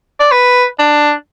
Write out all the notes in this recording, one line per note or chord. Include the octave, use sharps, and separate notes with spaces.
D5
B4
D4